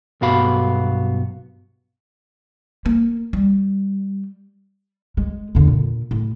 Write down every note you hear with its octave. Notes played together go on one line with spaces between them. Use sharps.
B1 G2 B3 F#4 F5 B5
A#3
G3
G#3
E2 D3
A#2
A2